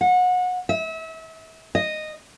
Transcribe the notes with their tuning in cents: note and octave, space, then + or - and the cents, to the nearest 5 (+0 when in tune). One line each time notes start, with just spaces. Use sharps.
F#5 -30
E5 -35
D#5 -10